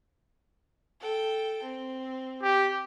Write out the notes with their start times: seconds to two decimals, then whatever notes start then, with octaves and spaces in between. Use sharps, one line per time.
1.00 A4 G5
1.63 C4
2.43 G4